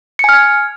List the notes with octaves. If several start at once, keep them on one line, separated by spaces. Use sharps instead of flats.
G#5 F6 G#6 C#7